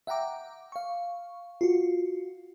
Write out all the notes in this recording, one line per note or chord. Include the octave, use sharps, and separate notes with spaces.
E5 F#5 G5 A#5 D6
F5 C#6
F4 F#4